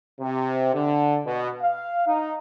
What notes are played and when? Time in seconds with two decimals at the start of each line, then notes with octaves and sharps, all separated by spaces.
0.20 C3
0.74 D3
1.25 B2
1.62 F5
2.07 D#4